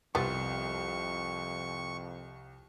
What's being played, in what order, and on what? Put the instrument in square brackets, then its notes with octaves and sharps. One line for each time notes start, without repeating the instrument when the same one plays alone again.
[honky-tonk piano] C2 [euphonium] F2 [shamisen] B3 C4 F4 [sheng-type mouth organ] C#6